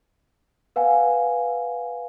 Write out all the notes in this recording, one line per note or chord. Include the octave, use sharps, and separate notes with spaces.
B4 F5 F#5 G#5